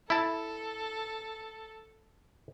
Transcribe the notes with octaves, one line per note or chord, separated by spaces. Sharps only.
E4 A4 A5